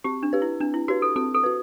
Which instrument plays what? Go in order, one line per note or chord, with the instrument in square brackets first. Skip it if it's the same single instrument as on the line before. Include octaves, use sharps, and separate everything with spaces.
[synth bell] C4 [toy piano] G4
[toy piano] D4
[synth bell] G4 B4
[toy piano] E4
[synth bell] C4 [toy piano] D4
[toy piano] E4
[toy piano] F#4 [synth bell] G4 B4
[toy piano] A4
[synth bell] C4 [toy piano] A4
[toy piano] A4
[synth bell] F#4 B4